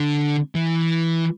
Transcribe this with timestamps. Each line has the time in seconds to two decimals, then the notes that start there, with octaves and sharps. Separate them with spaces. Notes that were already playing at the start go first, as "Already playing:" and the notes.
Already playing: D3
0.55 E3